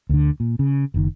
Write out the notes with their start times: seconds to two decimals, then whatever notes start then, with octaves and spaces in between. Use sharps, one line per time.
0.09 D2 D3
0.40 A#2
0.59 C#3
0.94 F#1 D#3